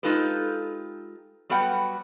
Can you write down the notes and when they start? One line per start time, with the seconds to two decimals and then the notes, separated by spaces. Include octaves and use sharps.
0.03 G#3 D#4 F4 G4 A4 B4
1.50 F#3 G3 B3 B4 F#5 G5